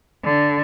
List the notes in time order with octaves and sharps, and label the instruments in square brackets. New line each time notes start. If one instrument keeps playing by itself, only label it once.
[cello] D3